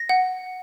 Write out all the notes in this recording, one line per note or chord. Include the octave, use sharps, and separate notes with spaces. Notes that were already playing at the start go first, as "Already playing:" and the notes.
Already playing: A#6
F#5